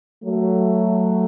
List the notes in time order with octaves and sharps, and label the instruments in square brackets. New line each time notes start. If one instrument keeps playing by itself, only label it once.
[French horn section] F#3 A3